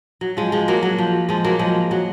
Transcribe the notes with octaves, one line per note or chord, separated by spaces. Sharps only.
F#3
F3 G#3
F3 G#3
F#3 A#3
F#3
F3
F3 G#3
F#3 A#3
F3 G#3
F#3